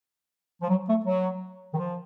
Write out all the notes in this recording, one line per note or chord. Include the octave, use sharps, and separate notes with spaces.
F3
F#3
A3
F#3
D#3
F3